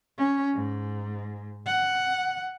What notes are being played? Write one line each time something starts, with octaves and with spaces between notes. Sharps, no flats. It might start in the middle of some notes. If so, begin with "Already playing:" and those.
C#4
G#2
F#5